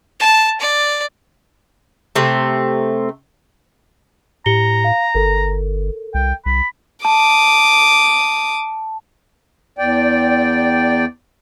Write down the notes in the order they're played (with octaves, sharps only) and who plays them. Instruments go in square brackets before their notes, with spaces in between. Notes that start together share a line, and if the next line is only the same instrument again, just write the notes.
[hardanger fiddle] A5
D5
[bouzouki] C3 A3 C4
[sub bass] A2 [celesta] G4 C#7 G7 [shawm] A#5
[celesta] F5
[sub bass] G1 [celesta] A4 A#4
[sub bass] C2 [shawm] G5
[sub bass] C2 [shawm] B5
[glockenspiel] A5 [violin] D6 D#6
[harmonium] E2 D5 G5